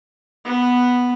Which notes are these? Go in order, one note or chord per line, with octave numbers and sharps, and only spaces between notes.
B3